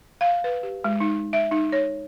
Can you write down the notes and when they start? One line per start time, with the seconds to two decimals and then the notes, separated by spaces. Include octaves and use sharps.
0.21 F5
0.44 B4
0.63 G4
0.84 G#3
1.00 D#4
1.33 E5
1.51 D#4
1.72 C#5